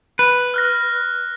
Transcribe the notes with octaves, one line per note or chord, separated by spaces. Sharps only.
B4
F6 F#6 A#6